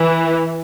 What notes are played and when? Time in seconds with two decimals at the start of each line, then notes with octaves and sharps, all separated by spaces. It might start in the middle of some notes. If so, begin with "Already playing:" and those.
Already playing: E3